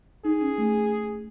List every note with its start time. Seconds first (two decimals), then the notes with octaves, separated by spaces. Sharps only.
0.25 D#4 G#4
0.41 C#4
0.58 A3